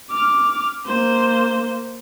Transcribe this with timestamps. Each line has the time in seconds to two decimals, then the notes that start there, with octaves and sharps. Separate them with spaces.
0.11 D6 F6
0.86 A#3 C5